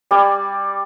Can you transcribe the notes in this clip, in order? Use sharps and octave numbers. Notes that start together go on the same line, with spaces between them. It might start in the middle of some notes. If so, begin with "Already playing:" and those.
G3 D5 G#5